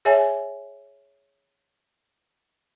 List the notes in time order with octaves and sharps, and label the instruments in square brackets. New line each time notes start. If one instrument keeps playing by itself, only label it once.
[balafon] G#4 C#5 E5 G#5